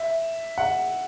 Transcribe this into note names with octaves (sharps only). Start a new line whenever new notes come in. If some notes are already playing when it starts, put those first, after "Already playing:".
Already playing: E5
F#5